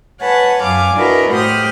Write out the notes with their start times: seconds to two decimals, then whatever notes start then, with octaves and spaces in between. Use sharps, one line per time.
0.21 B4 C#5 F#5 G#5 A5
0.62 F#2 F5 G#5 D6
0.95 D4 E4 F#4 A#4 B4 D#5
1.31 A2 G4 C5 F#5 D#6 F6